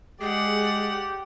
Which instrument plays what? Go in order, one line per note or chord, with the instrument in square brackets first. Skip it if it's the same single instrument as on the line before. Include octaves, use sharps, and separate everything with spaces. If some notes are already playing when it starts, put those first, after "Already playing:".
[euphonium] G#3 [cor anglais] G4 [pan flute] G#4 [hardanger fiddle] D5 F#5